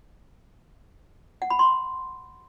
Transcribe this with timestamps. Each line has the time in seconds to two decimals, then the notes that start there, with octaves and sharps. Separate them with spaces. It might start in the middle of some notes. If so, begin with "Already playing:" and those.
1.42 F#5
1.50 B5
1.59 C6